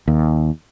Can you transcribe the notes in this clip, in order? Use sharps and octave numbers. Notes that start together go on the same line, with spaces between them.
D#2